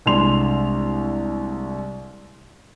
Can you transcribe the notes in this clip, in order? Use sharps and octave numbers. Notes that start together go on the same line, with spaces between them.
C2 G#3 D4 C6 F7